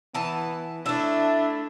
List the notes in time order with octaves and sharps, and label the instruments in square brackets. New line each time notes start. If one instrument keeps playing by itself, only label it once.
[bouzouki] E3 A5 [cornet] B3
[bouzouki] A3 E5 [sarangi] D4 [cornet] E4